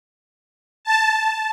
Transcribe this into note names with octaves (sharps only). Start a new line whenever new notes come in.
A5